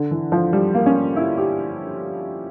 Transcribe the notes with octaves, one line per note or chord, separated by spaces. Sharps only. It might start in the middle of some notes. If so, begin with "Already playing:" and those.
Already playing: D3
E3
F3
G3
A#3
C#4
A#3
E4
G4